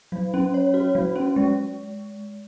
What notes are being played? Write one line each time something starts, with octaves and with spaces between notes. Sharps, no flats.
F#3
C#4
C#5
F#4
F#3
C#4
G#3